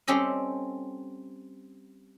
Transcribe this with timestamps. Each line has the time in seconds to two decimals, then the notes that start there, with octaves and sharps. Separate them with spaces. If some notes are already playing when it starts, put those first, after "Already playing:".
0.08 G3 C4 C#4 G4 A4 D#5